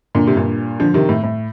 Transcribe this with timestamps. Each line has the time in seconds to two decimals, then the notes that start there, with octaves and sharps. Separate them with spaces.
0.15 A#2 D3
0.27 C3
0.36 G2 A#2
0.80 D3 F3
0.94 C3 D#3
1.09 A2
1.23 A2